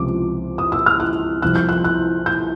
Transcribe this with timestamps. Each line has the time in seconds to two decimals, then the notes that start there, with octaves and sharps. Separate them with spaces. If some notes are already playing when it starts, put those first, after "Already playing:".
Already playing: C#2 C3 F3 D6
0.58 D#6
0.72 E6
0.86 F6
1.00 F#6
1.42 C2 C3 F3 F#6
1.56 G6
1.69 F#6
1.84 F#6
2.26 G6